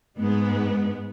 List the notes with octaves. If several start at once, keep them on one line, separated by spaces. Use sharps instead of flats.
G#2 G#3 B3